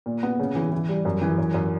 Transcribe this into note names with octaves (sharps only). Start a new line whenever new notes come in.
A#2
B3
C#3
E3
E3
G3
F#2
E3
F#2
F#2